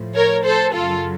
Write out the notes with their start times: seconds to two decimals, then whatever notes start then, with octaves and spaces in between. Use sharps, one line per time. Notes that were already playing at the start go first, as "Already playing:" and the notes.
Already playing: A2 F3
0.15 A#4 C#5
0.45 A4 C5
0.74 F#2 C#3 F#3 F4 A4